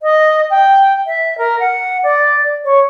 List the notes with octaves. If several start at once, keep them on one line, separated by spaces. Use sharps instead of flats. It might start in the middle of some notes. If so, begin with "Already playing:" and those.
D#5
G5
E5
A#4
F#5
D5
C#5